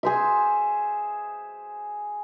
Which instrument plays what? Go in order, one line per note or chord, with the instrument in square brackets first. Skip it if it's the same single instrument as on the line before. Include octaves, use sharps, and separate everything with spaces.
[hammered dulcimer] G#4 C5 E5